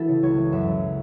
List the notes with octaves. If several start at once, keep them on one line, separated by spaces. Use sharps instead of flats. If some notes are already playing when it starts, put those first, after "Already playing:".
Already playing: E3 E4 F#4 A4
C#3
C#2 C#5
E3
F#2 E5
C#3